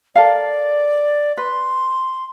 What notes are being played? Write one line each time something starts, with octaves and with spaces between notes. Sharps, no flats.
A4 A#4 D5 F5
B4 C6